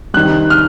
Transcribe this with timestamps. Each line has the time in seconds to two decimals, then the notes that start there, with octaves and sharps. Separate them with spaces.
0.14 C2 C3 D#3 F#6
0.50 F6